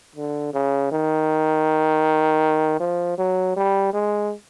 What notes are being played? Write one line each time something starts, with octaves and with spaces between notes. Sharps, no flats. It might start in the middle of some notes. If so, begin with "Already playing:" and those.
D3
C#3
D#3
F3
F#3
G3
G#3